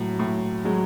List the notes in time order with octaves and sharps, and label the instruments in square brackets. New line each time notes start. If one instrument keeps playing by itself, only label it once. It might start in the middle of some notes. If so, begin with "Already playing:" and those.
Already playing: [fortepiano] A2 [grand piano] F#3
[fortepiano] A2
[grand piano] F#3 [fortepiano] G#3